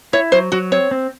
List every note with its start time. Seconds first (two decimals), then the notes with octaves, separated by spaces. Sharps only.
0.13 E4 C#5
0.32 F#3 C5
0.52 F#3 F#4
0.72 C4 C#5
0.91 C4